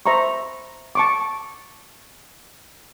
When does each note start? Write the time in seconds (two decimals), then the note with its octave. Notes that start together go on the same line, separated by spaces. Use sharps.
0.06 C5 E5 A#5 B5 C#6
0.95 A5 C#6 D6